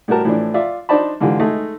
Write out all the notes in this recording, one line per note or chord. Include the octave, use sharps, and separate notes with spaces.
A2 G3 F#4 G4 A#4 A5
A2 E3 F3 D4
F4 D5 E5
D4 D#4 C5 D5 A5 B5
G#2 D3 E3 F4 G4
G#3 A3 D#4 G#4